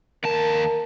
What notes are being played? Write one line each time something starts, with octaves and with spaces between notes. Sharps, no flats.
D#2 A#4 A5